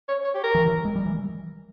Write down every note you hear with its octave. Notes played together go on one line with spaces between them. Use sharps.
C#5
C#5
G4
A#4
E3
E3
G#3
G3
E3